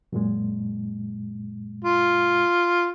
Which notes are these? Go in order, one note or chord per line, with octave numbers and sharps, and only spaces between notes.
F#2 A#2 G#3
F4